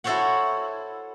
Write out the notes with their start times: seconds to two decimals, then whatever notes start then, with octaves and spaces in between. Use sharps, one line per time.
0.04 E4 F#4 A4 C5 C#5 F#5